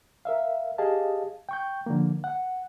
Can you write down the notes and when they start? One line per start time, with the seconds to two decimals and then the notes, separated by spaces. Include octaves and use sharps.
0.25 A#4 E5 F5
0.78 G4 G#4 D#5 F5 A5
1.49 G5 C#6 G6
1.86 D3 F3 A#3
2.24 F#5